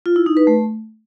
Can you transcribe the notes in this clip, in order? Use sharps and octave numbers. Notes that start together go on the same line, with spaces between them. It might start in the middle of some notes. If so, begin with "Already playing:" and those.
F4
E4
D#4
B4
A3